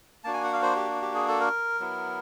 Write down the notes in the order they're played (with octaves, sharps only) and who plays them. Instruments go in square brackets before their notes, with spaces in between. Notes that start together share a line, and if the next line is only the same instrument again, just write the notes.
[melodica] A#3 D4 F#4 A5
G#5
F#5
F5
C5
G4
G4
G#4
A4
A#4
F#3 B3 E4